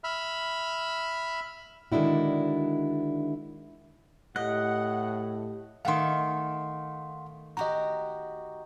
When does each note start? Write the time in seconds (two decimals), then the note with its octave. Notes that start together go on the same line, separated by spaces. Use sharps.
0.04 E5 B5 F6
1.92 D3 D#3 G#3 D4 E4 F#4
4.36 A2 G4 D#5 F#5 F#6
5.85 D#3 A3 F5 F#5 C6
7.57 F#4 G4 D#5 A#5